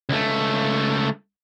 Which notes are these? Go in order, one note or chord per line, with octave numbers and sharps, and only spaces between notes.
C#2 A3